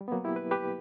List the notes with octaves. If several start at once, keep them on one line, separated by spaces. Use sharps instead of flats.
G3
B3
F#3 A#3
E4 G4
B4
G4 B4